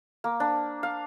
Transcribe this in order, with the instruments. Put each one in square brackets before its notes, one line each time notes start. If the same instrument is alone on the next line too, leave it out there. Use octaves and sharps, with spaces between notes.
[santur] A#3
D4
F5